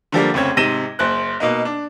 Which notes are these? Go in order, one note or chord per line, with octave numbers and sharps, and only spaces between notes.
D3 F3 G3 A#3
F1 C#3 C4 C#5 G#6
G#2 C3 A#6 D#7 E7 G7
F#1 C5 F#6
B2 A#3 D#4
D4